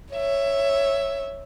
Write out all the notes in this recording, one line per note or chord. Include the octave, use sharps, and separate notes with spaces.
C#5 E5